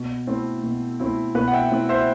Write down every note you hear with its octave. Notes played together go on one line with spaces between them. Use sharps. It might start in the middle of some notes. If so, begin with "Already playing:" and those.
Already playing: B2
A3 C4 E4
B2
A3 C4 E4
B2 B4
F#5
E5 G5
A3 C4 E4
C5 E5